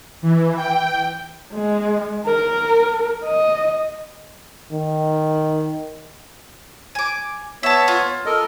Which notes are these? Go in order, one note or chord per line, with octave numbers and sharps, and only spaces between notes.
E3
G5
G#3
A#4
D#5
D#3
G#5 D6
B3 C#5 E5 A5
F4
A4 A#4 D#5